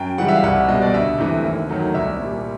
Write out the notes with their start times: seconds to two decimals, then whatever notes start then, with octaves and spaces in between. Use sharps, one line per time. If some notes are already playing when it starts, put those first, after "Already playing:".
Already playing: F#2 G5
0.18 C#3 E3 G3 F#5
0.28 E5
0.36 F5
0.43 C2 F#5
0.56 E5
0.68 B2 G3 D#5
0.82 D5
0.94 D2 E5
1.18 C3 E3 A3
1.44 D#2
1.69 D#3 F#3 A3
1.94 C2 E5
2.20 A#2 G3